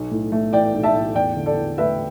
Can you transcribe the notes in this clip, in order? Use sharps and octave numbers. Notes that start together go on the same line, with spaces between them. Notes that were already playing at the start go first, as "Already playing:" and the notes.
Already playing: B1
A2
A3
E3 D5 G5
B1
E5 A5
A2
E2 D5 G5
D3
A4 D5
E2
A3 B4 E5